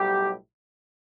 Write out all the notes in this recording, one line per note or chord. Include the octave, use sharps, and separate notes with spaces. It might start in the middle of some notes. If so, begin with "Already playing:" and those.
Already playing: B1 A2 G3 G4